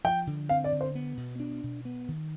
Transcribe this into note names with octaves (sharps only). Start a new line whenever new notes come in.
F3 G5
D3
C4 F5
D5
D3
C5
B3
B2
D4
B2
B3
D#3